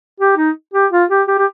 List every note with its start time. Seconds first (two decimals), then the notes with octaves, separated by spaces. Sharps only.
0.20 G4
0.37 D#4
0.74 G4
0.92 F4
1.10 G4
1.28 G4
1.38 G4